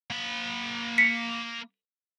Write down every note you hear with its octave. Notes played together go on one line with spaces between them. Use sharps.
A#3 B5
B6 C#7